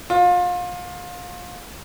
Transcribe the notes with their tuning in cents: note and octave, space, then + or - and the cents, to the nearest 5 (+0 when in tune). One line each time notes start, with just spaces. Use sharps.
F4 +30